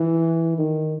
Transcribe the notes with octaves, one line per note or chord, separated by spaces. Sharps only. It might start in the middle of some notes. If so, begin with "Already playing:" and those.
Already playing: E3
D#3